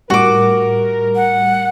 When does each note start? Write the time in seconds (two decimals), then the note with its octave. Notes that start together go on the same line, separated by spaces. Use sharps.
0.10 A2 G3 F#4 A#4 D6
1.15 F#5